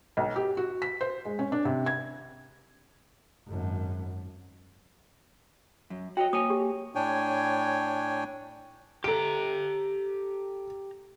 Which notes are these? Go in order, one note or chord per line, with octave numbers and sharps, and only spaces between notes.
B1
G4
F#4
B6
C5
G#3
C#4
D4
C3
G#6
G#1 F#2
F#2
F#4 C#5 D#5 G5
A#3 C#5 G#5 D#6
G4
A2 D4 C#5 G5 G#5
G4 A4 A#5 D7